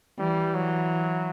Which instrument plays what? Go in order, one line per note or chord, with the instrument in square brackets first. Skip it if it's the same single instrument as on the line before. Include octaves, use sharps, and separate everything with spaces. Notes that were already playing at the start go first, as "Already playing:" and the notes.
[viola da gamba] E3 [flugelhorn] G3
[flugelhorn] F#3